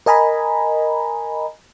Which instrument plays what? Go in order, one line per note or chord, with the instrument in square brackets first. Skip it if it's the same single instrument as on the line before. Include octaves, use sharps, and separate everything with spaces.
[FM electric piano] A#4 D#5 G#5 A#5 B5